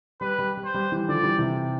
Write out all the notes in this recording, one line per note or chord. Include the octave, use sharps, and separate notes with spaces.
G3 B4
G3
G3
C5
G3
E3 G3
D3 F3 D5
E3 G3
C3 E3